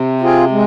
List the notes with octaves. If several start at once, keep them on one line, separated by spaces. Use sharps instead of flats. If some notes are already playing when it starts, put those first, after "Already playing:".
Already playing: C3
C4 F4 G#4
G#3